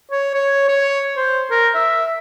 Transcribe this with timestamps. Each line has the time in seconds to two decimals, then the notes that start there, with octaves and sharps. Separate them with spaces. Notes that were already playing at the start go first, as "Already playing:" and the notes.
0.11 C#5
0.34 C#5
0.68 C#5
1.17 C5
1.51 A#4
1.74 E5